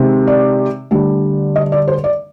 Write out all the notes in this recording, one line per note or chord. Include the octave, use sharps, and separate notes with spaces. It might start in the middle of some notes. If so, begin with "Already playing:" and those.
Already playing: C3 D#3 G#3 C4
D5
D2 D3 G3 D4
D#5
D5
C5
D5